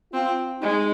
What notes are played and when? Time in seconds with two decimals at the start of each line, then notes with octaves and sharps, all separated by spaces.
0.13 C4 F4
0.62 G#3 D#4